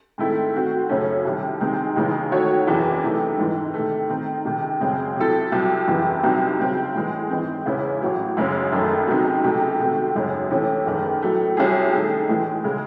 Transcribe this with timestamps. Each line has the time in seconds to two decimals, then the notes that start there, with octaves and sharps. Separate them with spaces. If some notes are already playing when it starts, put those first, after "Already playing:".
0.18 G#2 D#3 A3 C4 E4
0.54 D#3 A3 C4 F#4
0.89 F#2 C#3 F#3 A3 C#4
1.25 C2 C3 D#3
1.60 C3 D#3 G#3 C4 D#4
1.96 D#2 C#3 E3 G#3 D#4
2.32 D#3 A3 D#4 F#4 C#5
2.67 F#1 E2 C3 E3
3.03 C3 E3 A3 D#4
3.38 G#1 G#2 E3
3.74 C3 D#3 A3
4.10 D#3 A3 C4 D#4
4.45 C#2 C3 D#3
4.81 F#2 C#3 G#3 C4
5.16 C3 F#3 C4 E4 A4
5.52 C2 C3 F#3
5.88 F#1 E2 C3 E3
6.23 C2 C3 F#3 C4 D#4
6.59 C#2 C#3 F#3 C4
6.94 A2 E3 G#3
7.30 G#1 G#2 E3 C4
7.66 E2 C#3 G#3 C#4 E4
8.01 A1 A2 F#3
8.37 F#2 C#3 G#3 C#4
8.72 F#1 F#2 D#3 A3
9.08 C#2 C3 F#3 C4 D#4
9.44 C#2 C3 F#3 A3 D#4
9.79 C3 D#3 A3 C4 F#4
10.15 G#1 F#2 C#3 G#3 C#4
10.50 C3 E3 A3 C#4
10.86 F#1 E2 D#3 A3
11.22 A2 F#3 A3
11.57 C2 C3 F#3 C#4 G#4
11.92 D#3 A3 D#4 G#4
12.29 A2 E3 G#3
12.64 C#3 G#3